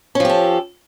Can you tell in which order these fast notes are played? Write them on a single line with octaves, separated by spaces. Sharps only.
C#4 F3 G4 A4